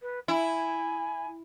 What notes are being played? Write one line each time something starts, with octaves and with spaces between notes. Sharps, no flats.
B4
E4 G#5